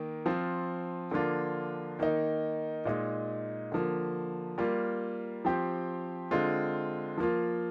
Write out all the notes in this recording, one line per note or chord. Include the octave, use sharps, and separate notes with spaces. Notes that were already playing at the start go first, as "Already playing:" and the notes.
Already playing: D#3 A#3
F3 C4 F4
D3 F3 A#3 D4 F4
D#3 A#3 D#4
A#2 G#3 D#4
D3 F3 A#3
G3 A#3 F4
F3 C4 G4
D3 G#3 C4 F4
F3 A#3 F4